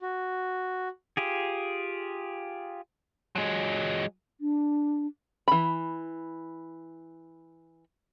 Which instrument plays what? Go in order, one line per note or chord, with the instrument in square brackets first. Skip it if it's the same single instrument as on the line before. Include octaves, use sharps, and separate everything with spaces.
[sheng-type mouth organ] F#4
[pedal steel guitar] F4 G4 G#4
[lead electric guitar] F#3 G#3
[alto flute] D4
[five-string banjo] E3 B5